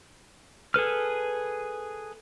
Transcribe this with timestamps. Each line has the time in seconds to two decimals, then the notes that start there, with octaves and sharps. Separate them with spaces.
0.74 G#4 A4 B4 F6